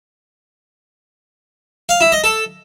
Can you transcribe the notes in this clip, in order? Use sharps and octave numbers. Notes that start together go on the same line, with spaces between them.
F5
E4
D#5
A4